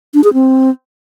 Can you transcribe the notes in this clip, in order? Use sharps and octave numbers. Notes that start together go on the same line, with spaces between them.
D4
G#4
C4